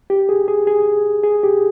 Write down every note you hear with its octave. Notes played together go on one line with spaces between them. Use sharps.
G4
G#4
G#4
G#4
G#4
G4